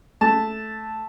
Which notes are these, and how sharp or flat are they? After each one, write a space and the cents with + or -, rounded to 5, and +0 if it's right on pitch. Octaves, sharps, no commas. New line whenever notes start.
A3 -10 A5 +0